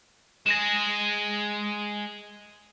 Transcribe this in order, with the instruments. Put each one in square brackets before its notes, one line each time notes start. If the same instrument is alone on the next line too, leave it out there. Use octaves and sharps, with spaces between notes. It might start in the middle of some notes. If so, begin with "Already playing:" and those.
[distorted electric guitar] G#3 G#4 [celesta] A#6 E7